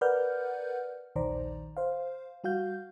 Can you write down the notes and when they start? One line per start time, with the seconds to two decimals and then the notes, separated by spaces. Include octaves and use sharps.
0.01 A#4 B4 D5 F#5 F6 G6
1.16 A#1 D#2 D#3 C5 D5 A#5
1.77 C5 F5
2.44 G3 F#4 F5 G6